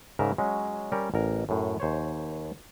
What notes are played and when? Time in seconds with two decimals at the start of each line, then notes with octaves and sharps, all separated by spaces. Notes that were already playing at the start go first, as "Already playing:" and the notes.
0.19 G#2 C#3 A#4 E5
0.38 F#3 G#3 C#4
0.92 G3 C#4 G4 A#4
1.14 A1 A#4
1.49 F#2 A2
1.80 D#2 C5 C#5